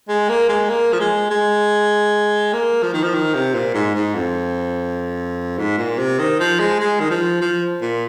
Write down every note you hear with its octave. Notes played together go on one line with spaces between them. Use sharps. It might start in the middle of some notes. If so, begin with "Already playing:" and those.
G#3
A#3
G#3
A#3
F3
G#3
G#3
A#3
F3
D#3
F3
D#3
C3
A#2
G#2
G#2
F2
G#2
A#2
C3
D#3
F3
G#3
G#3
D#3
F3
F3
A#2